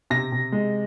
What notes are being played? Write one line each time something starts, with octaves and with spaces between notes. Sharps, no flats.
C3 A#6
C3
G#3